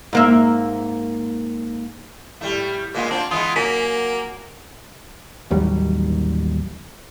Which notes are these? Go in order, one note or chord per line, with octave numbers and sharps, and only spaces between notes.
G#2 A#3 E5
A2 G3 A3
A#2 G#3 A#3 B3 F4 G#6
C4 D4 F4
E3 G#3 B3 F4 D#6
F#3 A#3 G#5 B6
A1 D#2 F#3 G3